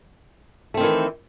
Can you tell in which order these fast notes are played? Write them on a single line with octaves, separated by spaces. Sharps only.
A3 C4 D#3 E3